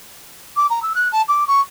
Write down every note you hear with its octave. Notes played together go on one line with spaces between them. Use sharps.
D6
A#5
E6
F#6
A5
D6
C#6